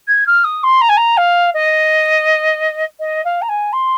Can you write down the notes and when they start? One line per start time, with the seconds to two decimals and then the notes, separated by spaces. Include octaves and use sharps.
0.08 G#6
0.27 F6
0.44 D#6
0.64 C6
0.81 A#5
0.89 G#5
0.97 A#5
1.17 F5
1.54 D#5
3.00 D#5
3.25 F5
3.42 A#5
3.49 G#5
3.73 C6